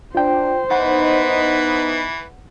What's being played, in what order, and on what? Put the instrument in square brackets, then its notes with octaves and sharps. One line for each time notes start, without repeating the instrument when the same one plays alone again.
[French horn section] D4 [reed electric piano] F4 G5 [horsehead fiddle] C5
[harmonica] E3 B4 [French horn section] B3 D#4 [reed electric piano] F#5